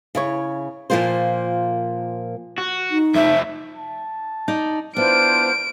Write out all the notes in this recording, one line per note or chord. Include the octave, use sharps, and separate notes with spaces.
C#3 E4 C#5
A#2 D#3 F3 A#3 F4 C5
F#4
D#4
F2 A3 C4 E5
A5
D#4 D5
B3 D4 E4 F4 C5 F6 D7